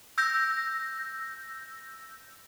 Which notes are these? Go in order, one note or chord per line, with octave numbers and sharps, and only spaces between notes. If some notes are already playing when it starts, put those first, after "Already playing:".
E6 G6 A#6